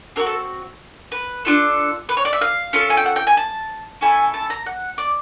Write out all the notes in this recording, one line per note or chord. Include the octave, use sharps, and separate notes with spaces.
C4 D#4 F#4 A#4
A4
B4
D4 F4 A4
B4
C#5
D5
E5
F5
C#4 F4 A4
G#5
G5
F#5
G5
G#5
A5
C#4 E4 A4 G#5
A5
A#5
F#5
D5